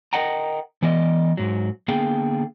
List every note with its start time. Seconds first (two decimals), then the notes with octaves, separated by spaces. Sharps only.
0.13 A#4 C5 D#5 F#5 G5 A#5
0.82 E3 B3 D5 D#5
1.37 G#2 F#3
1.88 D3 A#3 B3 G#4 F5 G5